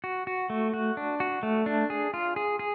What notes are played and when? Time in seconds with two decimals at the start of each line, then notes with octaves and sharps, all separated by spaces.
0.04 F#4
0.27 F#4
0.50 A3
0.74 F#4
0.97 D4
1.20 F#4
1.43 A3
1.66 D4
1.90 G#4
2.14 F4
2.36 G#4
2.59 G#4